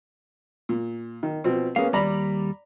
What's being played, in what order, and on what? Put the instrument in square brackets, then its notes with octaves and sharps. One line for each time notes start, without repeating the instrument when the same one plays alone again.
[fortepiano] A#2
D#3
B2 F3 C4
[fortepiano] A#3 B3 C#4 [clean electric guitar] G#4 F5
[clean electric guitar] D#2 G3 [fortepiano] D5 A#5 B5